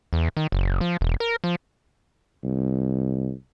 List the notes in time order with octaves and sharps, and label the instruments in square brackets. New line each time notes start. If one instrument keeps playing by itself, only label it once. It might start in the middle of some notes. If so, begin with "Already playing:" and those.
[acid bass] E2
D#3
F#1
F3
E1
A#4
F3
[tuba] C2